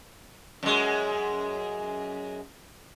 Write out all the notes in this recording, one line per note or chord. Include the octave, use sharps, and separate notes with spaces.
F#2 G#3